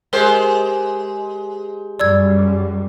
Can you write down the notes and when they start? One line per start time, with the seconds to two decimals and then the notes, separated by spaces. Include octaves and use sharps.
0.13 G#3 G4 A#4 C5
2.00 F#2 G3 D5 E6 G#6